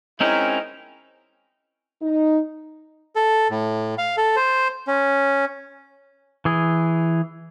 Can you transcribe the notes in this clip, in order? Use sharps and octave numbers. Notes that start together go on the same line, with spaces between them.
G#3 C4 C#4 D#4 E4 A#4
D#4
A4
A2
F5
A4
C5
C#4
E3 G#4